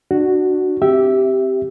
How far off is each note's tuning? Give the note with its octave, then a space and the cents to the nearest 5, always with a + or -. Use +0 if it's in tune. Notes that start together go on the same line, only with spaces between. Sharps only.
D4 +20 F#4 +0
C4 +0 G4 -10 E5 +0